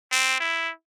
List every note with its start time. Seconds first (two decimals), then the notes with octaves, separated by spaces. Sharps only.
0.12 C4
0.40 E4